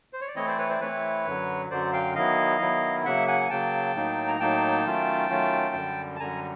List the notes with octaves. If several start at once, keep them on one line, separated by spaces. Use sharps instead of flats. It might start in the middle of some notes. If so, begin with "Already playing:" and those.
C5
C#5
D5
E3 A3 C4 E4 C#5 D#5
C5 D5
B4 C#5
C5 D5
E3 A3 C4 E4 B4 C#5
F#2 D3 F#3
F#2 D3 F#3 C5 D5
F5 G5
D#3 F#3 B3 E4 D#5 F5
D#3 F#3 B3 E4
C#3 F#3 A#3 E5 F#5
F#5 G#5
G#5
C#3 F#3 A#3 G5 A5
A2 F#3 A#3 D#4
A#5
A2 F#3 A#3 D#4 G5 A5
D#3 F#3 A3 C#4 F4
D#3 F#3 A3 C#4 F4
F#2 D3 G3
A5
F#2 D3 G3 G#5 A#5